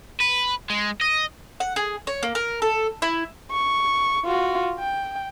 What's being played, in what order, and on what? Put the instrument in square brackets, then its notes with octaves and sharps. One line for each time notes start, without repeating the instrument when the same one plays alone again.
[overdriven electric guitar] B4
G#3
D#5
[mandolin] F#5
G#4
C#5
A#3
A#4
A4
E4
[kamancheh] C#6
F4 F#4
G5